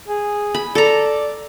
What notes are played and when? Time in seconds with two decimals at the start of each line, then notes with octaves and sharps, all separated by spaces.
0.08 G#4
0.55 B5
0.75 A4 D5 A#5